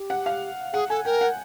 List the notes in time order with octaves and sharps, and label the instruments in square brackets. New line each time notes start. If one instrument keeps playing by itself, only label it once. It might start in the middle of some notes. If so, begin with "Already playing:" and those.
Already playing: [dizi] G4
[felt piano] F#5
F5
[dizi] G#4 [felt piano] F#5
[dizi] A4 [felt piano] G#5
[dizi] A#4 [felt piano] G5
[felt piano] F#5